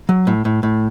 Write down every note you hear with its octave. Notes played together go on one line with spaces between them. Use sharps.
F#3
A2
A2
A2